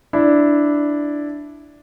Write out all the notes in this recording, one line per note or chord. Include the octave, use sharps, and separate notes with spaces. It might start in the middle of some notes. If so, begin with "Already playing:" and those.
D4 E4